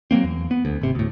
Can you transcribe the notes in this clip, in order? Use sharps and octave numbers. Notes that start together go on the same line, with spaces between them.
F#3 A3 A#3 C4
E2
B3
D2
G#1 C3
D2 A2